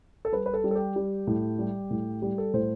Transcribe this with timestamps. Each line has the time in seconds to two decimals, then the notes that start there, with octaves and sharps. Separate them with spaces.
0.25 A4
0.32 G3 B4
0.46 B4
0.54 A4
0.64 G3
0.71 A4
0.75 G4
0.96 G3
1.27 A2
1.59 G3
1.91 A2
2.22 G3 G4
2.38 A4
2.54 A2 C5